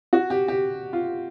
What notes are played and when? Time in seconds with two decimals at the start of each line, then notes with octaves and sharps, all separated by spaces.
0.13 F#4
0.30 G4
0.48 G4
0.93 F4